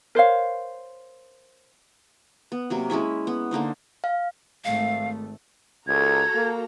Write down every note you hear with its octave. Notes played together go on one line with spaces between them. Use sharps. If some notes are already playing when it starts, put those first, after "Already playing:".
A#4 C5 C#5 F5
B3
C3 F#3 A#3
G#3 C#4 E4 E5
B3
D3 A#3 D#4 C5
F5
G#1 A3 F5
C#2 F#4 A4 A#5 G#6
A#3